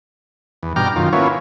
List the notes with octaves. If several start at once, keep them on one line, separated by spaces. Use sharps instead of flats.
E2
G2 B2 G5 A#5 D6 F6
F#2 D#3 F4
A#3 B3 C#4 E4 F4 C#5